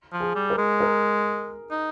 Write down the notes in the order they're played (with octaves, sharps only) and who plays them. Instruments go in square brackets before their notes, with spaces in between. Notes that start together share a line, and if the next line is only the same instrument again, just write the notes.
[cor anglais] F3
[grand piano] G#4
[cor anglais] G3
[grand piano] A#4
[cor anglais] G#3
[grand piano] A#4
[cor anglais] D#4